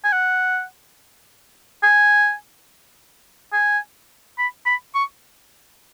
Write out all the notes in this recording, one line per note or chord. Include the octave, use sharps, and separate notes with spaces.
G#5
F#5
G#5
G#5
B5
B5
C#6